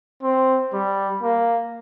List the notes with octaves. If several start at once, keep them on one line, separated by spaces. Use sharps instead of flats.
C4
G3
A#3